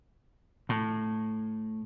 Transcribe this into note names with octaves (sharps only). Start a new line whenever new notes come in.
A2